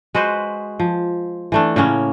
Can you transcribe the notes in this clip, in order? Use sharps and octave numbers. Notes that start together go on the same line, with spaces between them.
G#3 F#4 B4 C5
F3
E3 A3 D4
A2 C#3 A#3 C#4